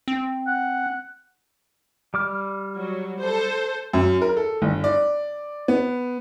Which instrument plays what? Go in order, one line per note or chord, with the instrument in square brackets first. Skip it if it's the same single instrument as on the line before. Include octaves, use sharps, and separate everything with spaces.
[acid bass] C4
[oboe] F#5
[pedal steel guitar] G3 D6 F6
[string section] F#3
A4 C5
[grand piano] F#2
A#4
A4
G1
D5
B3